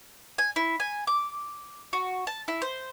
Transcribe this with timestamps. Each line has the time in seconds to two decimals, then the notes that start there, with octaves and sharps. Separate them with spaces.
0.38 G#5
0.56 E4
0.80 G#5
1.07 D6
1.93 F#4
2.27 A5
2.48 E4
2.62 C5